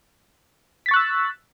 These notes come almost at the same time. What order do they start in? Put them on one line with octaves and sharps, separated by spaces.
B6 A6 C#6 F#6 E6